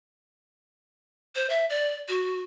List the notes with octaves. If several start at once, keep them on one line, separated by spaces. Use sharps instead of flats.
C5
E5
D5
F#4